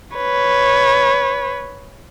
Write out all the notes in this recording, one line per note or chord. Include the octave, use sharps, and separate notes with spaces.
B4 C#5